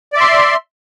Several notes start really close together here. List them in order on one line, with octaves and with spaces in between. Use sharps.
D5 E5 C6